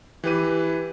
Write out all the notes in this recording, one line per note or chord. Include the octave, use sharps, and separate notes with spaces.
E3 G4 B4 D#7